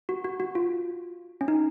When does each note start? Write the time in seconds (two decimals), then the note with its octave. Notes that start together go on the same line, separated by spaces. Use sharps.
0.09 F#4
0.24 F#4
0.40 F#4
0.55 F4
1.41 C#4
1.48 D#4